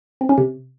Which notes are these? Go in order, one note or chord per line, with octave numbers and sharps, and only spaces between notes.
C4
C#4
C3